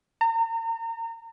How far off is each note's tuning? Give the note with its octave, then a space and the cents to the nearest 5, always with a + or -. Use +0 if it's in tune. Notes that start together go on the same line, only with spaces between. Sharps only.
A#5 -40